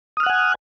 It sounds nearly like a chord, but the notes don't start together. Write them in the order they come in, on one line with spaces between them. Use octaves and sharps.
D#6 F6 F#6 F#5 G#5